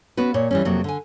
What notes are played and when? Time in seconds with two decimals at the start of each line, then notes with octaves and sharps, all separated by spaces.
0.17 B3 C#4 F#4 B4
0.34 A#2 C#5
0.51 E3 G3 C#4
0.65 F2 C3 F#3 A#3
0.84 D3 G#5